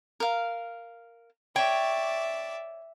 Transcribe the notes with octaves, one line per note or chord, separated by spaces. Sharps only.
A#4 F5
C#5 D5 E5 G5